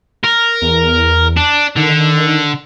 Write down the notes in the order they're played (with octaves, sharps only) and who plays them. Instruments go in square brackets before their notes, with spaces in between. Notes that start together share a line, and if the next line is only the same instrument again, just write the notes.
[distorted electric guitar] A#4
[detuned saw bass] E2
[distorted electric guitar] D4
[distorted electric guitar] D3 [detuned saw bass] D#3